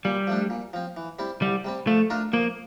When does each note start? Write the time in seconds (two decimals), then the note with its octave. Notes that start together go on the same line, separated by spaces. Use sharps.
0.05 A#2 G3
0.27 F3 A3 D4
0.50 A#2
0.73 F3 C4
0.97 E3
1.19 G3 C4 E4
1.42 C2 G3
1.64 C3 G3 C4
1.87 F3 A3
2.10 A3 D4 F4 A#4
2.33 F3 A#3